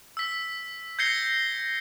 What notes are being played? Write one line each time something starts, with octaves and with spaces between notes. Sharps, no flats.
E6 B6
G6 G#6 A#6 C7 C#7 G7